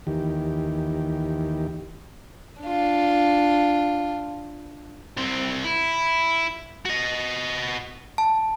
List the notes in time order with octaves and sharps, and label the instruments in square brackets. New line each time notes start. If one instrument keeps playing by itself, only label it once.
[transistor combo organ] D#2 D#3 E3 G4
[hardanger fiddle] D4 F4
[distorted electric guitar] C2 C4
E4
F#4 D#5
[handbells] A5